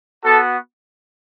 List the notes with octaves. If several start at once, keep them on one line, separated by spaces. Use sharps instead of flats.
B3 F#4 A4